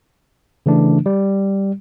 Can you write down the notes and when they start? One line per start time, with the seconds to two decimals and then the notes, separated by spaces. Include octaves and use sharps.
0.66 C#3 E3 A3 D4
1.06 G3